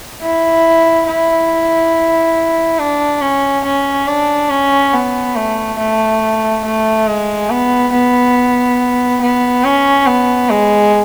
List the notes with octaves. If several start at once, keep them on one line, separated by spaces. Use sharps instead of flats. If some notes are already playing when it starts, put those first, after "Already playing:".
E4
E4
D4
C#4
C#4
D4
C#4
B3
A3
A3
A3
G#3
B3
B3
B3
C#4
B3
G#3